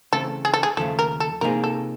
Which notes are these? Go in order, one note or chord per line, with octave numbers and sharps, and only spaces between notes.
C#3 E3 A3 C4 A4
G#4
A4
G#4
D#2 C#3 F3 A3 A4
A#4
A4
C3 F3 A#3 D#4 G#4 A#4
A4